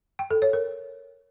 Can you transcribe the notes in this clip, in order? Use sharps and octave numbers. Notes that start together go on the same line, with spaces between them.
G5
A4
C#5
A#4